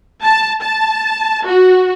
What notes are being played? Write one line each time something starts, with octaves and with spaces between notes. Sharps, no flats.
A5
A5
F#4